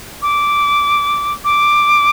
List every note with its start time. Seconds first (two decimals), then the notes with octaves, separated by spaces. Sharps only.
0.22 D6
1.44 D6